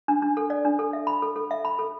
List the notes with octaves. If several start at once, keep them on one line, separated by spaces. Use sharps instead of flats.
D4
D4
A4
D5
D4
A4
E5
B5
A4
A4
E5
B5
A4